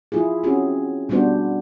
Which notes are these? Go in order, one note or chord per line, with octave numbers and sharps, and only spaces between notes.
F3 E4 F4 G#4
C4 C#4 F#4 G#4
B2 G3 B3 D4 F#4 C5